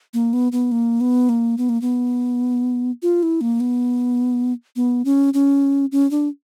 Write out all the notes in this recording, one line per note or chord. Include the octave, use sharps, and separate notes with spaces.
A#3
B3
B3
A#3
B3
A#3
B3
A#3
B3
F4
E4
A#3
B3
B3
C#4
C#4
C#4
D4